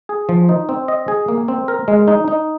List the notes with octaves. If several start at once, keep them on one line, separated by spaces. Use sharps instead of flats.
G#4
F3
D#4
C4
D#5
G#4
A#3
C4
A#4
G#3
D#4
D#4